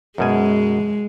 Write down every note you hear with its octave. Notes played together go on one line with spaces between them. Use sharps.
F#2 B2 G#3 G#5